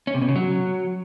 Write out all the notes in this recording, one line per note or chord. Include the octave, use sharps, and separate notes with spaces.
C#4
C3
B2
C#3
F#3